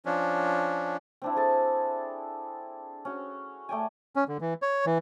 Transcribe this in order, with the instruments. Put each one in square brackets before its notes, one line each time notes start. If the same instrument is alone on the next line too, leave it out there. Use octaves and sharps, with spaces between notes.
[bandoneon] F3 C#4 D4
[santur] C4 D4 E4
G#4 A4 G#5 A5
C#4 F#4
A3 D5 G5 G#5
[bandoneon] C#4
D3
E3
C#5
E3